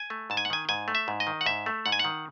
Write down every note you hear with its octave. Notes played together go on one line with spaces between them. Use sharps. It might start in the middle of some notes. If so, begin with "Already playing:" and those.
Already playing: G#5
A3
G#2 A5
G#5
F#5
D#3 G#5
G#2 G#5
A3
E5
G#2
D#5
D#3
F#5
G#2 E5
A3
G#2 F#5
G#5
F#5
D#3